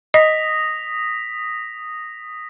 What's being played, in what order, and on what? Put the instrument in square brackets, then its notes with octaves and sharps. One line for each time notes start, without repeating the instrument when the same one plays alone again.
[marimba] D#5 [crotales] D#6 A#6 B6